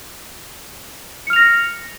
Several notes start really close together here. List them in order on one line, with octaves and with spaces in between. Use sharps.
C#7 F6 F7 A#6